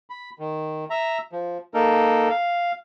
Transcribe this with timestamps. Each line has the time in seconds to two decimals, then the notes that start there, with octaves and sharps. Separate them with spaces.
0.10 B5
0.39 D#3
0.90 E5 A#5
1.32 F3
1.74 A#3 D#4 A4 A#4
2.30 F5